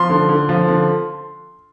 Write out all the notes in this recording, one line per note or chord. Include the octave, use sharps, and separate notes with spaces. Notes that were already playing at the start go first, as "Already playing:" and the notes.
Already playing: F3 C6
D3
D3
F3
D3